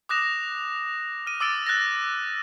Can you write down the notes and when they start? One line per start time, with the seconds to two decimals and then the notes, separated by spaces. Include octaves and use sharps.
0.09 D6 D#6 F#6 A#6 E7
1.27 F6 D#7
1.40 D6 E6 A6 D7 G7
1.67 F#6 A6 A#6